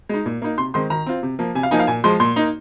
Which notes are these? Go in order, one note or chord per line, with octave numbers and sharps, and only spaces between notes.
G#3 D#4
A#2
A#3 D#4
C3 C6
D#3 G#3 C4 C6
D#3 A#5
C4 F4
C3
F3 A#3
C3 G#5
F5
F3 A#3 D#4 G#5
F5
A#2 G#5
F3 G#3 C6
A#2 C6
A#3 D#4